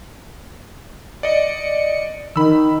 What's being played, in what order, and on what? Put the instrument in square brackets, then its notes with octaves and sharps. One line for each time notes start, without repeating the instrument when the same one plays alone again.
[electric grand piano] D5 D#5 [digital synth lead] C#7
[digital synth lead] D#3 [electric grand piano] B5 E6